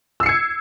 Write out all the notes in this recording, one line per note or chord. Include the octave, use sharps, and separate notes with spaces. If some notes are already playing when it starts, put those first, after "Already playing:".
E6 G#6 C7 C#7